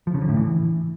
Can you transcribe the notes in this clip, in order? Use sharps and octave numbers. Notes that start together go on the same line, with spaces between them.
F3
C#3
D3
A2
E3